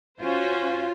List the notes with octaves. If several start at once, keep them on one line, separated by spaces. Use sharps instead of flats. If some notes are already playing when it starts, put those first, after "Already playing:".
C#4 F4 F#4 C5